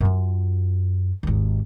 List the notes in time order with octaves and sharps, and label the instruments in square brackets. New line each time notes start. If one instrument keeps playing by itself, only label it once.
[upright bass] F#2 F4
G#1 D#2